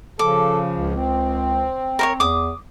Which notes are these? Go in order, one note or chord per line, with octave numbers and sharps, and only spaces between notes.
C#3 F3 A4 D6
C#2
C4
A#4 C5 C#5
E2 D6 D#6